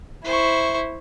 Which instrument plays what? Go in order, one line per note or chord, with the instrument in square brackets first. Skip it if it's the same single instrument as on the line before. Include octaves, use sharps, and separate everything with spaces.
[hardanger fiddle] E4 [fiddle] C5 C#6